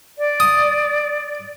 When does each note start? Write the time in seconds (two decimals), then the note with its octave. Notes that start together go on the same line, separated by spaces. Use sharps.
0.18 D5
0.40 D#6